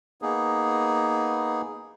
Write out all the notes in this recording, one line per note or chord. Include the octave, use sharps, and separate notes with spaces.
A#3 B3 D#4 G#4